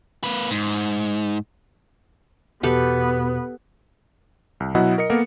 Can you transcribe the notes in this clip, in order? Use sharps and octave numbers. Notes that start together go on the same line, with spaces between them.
A#3 B4
G#2
E2 B2 B3 G4 A4 B4
C2
B2 F#3 E4 D#5 F#5
A#4 D#5 C#7
A#3 B3 A4 A#4